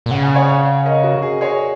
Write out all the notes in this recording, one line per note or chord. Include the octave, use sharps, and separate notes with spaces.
A#2
C#3 F#5
G#5
C#5 F#5
A#4 D#5
F#4
G#4
G#4 C#5